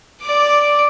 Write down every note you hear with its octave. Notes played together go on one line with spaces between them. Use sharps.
D5 D6